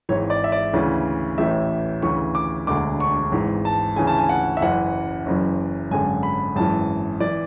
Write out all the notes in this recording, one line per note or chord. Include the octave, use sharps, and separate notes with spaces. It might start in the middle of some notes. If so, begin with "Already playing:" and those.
G#1 G#2 E3 C#5
D5
E5
D5
D2 C#3 E3
A1 A2 E3 E5
D2 C#3 E3 C#6
D6
E1 D2 D3 D6
C#6
G#1 G#2 E3
A5
D2 C#3 E3 G#5
A5
G#5
F#5
E5
F#1 F#2 E3 F#5
F#1 F#2 E3
G#1 F#2 D3 G#5
B5
G#1 F#2 E3 A5
E3 D5